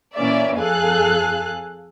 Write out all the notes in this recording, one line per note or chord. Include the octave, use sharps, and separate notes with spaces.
A#2 E3 A#3 C#4 D5 E5
F2 G#4 A4 F5 G#5 F#6